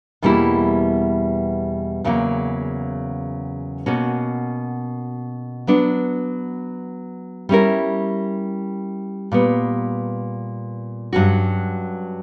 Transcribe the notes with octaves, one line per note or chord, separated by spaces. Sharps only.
E2 B2 G3 A#3 E4
E2 C#3 F#3 A#3
B2 A#3 C#4 F#4
F#3 B3 D4
G3 C#4 E4 A#4
A#2 G3 B3
G2 F#3 C#4 F#4